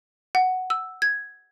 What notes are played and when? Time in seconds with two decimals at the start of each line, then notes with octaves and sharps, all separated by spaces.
0.35 F#5
0.70 E6
1.02 G#6